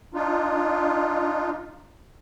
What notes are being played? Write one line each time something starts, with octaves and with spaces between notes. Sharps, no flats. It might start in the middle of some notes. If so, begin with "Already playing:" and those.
D4 D#4 F4